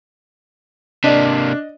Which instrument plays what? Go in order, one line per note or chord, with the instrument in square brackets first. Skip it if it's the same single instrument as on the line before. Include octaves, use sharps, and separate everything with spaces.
[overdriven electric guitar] C3 A#3 [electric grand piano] D4 [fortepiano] D5 D#5